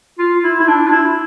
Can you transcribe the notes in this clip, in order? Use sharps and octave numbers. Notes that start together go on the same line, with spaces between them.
F4
E4
E4
D4
F4
E4